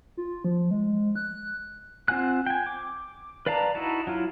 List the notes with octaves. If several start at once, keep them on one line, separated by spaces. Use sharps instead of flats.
F4
F3
G#3
F#6
C4 F4 F#5 G#5 F#6
G5 G#5
D6
B4 D5 F5 A5 A#5
D#4 E4 F#4 A5
F#3 E4 F4